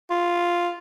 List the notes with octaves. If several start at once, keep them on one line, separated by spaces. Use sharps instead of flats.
F4